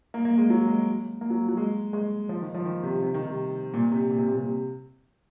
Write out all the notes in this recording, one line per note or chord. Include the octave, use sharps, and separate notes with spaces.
A#3
A#3
G#3
F#3
G#3
A#3
F#3
F#3
G#3
G#3
F3
D#3
F3
D#3
C3
C3
D#3
C3
A#2
C3
A#2
C3
A#2
C3